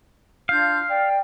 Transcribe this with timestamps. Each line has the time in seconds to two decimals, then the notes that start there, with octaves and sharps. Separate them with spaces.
0.49 D4 F4 F5 G6
0.87 D5 G5